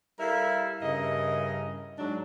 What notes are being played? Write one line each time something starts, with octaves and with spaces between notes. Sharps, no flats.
G3 E4 A4 A#4 E5 F5
G2 C#3 E4 A#4 D#5
G#2 F#3 D4